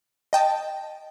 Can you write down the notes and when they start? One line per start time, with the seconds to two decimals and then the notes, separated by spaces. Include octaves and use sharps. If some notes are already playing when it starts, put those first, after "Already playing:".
0.33 D#5 G5 A5